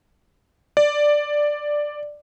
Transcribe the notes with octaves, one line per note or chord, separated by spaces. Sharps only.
D5